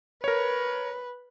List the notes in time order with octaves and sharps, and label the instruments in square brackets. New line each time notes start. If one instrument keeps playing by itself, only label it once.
[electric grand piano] A#4 C#5 [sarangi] B4